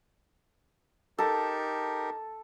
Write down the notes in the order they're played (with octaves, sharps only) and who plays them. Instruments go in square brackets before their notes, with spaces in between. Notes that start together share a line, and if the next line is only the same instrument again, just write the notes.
[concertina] D#4 G4 A#4 [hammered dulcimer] A4